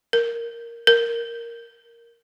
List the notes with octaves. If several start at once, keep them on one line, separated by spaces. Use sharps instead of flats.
A#4
A#4